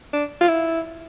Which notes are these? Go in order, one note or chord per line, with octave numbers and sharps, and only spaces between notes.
D4
F4
E4